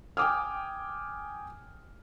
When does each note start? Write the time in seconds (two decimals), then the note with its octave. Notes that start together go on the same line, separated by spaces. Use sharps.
0.17 G5 G#5 D6 D#6 F6